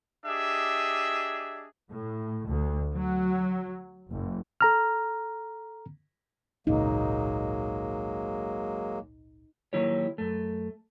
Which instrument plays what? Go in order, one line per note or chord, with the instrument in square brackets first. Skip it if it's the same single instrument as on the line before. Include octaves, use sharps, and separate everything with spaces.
[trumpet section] D4 G4 G#4 D#5 E5
[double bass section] A2
D2
F#3
F#1
[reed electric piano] A4 A#5 F6
[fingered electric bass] G#1 C#2 A#2 [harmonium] F#3 G#3 A#3 [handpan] D#4
[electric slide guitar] D#3 F#3 A#3 E4 G4 C#5
F#2 A3